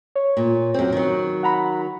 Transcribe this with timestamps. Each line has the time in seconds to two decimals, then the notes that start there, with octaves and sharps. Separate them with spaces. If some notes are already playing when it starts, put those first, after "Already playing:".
0.15 C#5
0.37 A#2
0.74 F#2 C4
0.92 D#3 F#3
1.43 F#5 A#5 B5